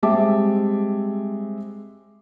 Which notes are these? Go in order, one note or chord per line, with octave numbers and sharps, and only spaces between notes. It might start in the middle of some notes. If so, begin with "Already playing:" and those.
G3 G#3 C4 E5 A5 D6